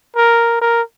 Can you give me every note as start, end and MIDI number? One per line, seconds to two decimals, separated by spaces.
0.16 0.58 70
0.62 0.82 70